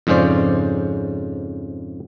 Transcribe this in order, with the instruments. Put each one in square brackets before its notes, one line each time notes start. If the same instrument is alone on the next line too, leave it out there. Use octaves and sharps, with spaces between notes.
[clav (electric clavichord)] F2 G#2 C#3 C#4 C5 D5